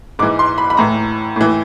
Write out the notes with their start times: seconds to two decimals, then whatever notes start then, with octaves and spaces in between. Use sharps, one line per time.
0.19 G#2 E3 D6
0.39 C6
0.58 B5
0.70 B5
0.77 A2 E3 A#5
1.36 A2 E3